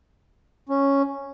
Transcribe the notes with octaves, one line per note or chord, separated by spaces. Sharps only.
C#4